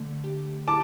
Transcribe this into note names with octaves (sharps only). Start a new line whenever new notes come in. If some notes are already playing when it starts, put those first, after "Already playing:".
Already playing: D3 A3
G4
E4 A5 D6